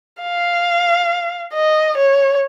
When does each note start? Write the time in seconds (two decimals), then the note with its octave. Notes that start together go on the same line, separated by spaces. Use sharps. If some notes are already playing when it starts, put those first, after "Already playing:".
0.21 F5
1.53 D#5
1.97 C#5